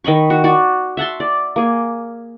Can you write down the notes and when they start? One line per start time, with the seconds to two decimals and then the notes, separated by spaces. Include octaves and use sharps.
0.04 D#3 D#5 B5 C#6
0.30 F#4
0.44 F#4 D5
0.97 E5 F#5 A5 C6
1.20 D5
1.56 A#3 G#4